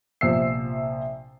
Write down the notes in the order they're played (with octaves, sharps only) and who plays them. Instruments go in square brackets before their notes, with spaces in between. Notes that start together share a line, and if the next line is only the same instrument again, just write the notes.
[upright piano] A#1 C3 F3 E5 E6 C7